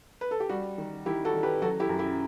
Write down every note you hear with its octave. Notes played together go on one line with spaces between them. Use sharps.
B4
A4
G4
G3 F#4
D#3
D#3 E4 G4
F#4 A4
D#3
G4 B4
F#3 F#4 A4
E4 G4
F#2
E4 G4